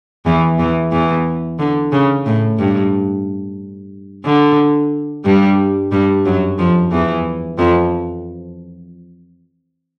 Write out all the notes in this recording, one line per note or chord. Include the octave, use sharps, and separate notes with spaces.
E2 E3
E2 E3
E2 E3
D3
C#3
A2
G2
D3
G2 G3
G2 G3
F#2 F#3
F2 F3
E2 E3
F2 F3